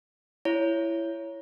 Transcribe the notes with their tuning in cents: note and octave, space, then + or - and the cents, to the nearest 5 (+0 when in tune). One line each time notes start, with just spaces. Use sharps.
E4 +15 C#5 +0